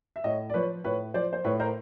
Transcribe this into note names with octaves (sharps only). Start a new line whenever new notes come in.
E5
A2 C#5 D#5
D5
F3 B4 C#5
A2 B4 C#5
F3 C5 D5
C5
A2 B4 C#5
A#4 C5